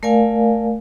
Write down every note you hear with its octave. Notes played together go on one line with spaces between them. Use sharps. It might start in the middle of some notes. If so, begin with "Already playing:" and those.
A3 A#4 D5 F5 G#5